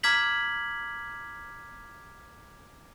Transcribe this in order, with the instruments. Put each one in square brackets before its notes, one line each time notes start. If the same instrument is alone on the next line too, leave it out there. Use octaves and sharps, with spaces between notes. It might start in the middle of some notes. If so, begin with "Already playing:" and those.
[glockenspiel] A#5 D6 F6 G#6 B6 F#7